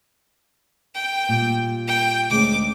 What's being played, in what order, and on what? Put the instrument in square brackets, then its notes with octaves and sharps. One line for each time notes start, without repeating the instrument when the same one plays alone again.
[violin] G5
[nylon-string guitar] A#2 G3
[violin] G5
[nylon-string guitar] D2 G#3 C#4 [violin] D6